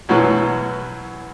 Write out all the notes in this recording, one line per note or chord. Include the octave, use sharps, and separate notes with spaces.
F#2 B2 E3 F#3